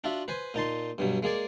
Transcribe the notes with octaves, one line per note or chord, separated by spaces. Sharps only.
D4 F4 F#4 E5
B4 C5 G#5
A#2 D#4 A5 C6
G2 B2 F#3
G#3 A#3 G#4 D5